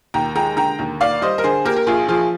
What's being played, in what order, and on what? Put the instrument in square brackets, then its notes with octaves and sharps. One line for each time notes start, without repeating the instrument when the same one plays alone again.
[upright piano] D#2 G5 A#5
G#3 G5 A#5
D3 G5 A#5
D#2
D#2 D5 F5
G3 C5 D#5
A#4
D3 G#4 C5
A#3 G4 A#4
A#4
A#1 F4 G#4
F3 F4 G#4